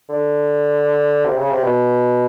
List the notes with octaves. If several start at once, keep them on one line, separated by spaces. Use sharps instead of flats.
D3
C3
C#3
C3
B2